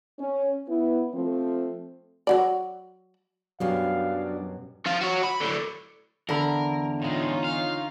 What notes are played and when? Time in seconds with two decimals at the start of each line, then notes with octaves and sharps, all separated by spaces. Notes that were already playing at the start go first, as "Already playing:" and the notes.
0.19 C#4
0.68 B3 E4
1.13 F3 A3 C4
2.27 F#3 F#4 D5
3.60 F#2 B2 F#3 G3 D4 F5
4.86 F3 F4
5.01 F#4 C#5
5.23 B5
5.40 A2 D3
6.29 E2 D3 A4 A#4 B5
7.02 A2 G#3 C#4 D#4 F4
7.44 F5